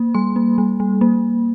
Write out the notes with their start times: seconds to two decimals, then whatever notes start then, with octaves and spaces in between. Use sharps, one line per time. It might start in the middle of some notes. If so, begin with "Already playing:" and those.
Already playing: A#3
0.15 G3 C6
0.36 A#3
0.58 G3
0.80 G3
1.01 A#3